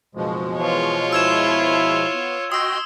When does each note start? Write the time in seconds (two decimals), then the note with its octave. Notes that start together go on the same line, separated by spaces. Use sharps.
0.15 F#1 B2 F3 G#3
0.58 E3 F4 C#5
1.13 E4 E6 G#6 E7
2.13 B3
2.52 F#4 D#5 G5 C6 D#6 E6